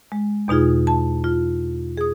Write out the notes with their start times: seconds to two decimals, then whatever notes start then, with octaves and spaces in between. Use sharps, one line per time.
0.12 G#3
0.48 E2 B2 D#4 F4 G#4
0.87 A5
1.24 F4
1.97 G#4 D#6